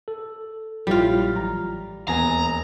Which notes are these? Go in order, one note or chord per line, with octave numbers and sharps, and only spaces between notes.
A4
A#1 F#3 G3 E4 F4
A1 A#5
E1 D#2 B3 G#5 A#5